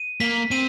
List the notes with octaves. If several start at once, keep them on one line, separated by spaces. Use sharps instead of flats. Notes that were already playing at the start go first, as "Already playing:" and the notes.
Already playing: D#7
A#3 B6
C4 D#7